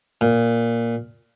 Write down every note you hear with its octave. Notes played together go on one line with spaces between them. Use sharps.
A#2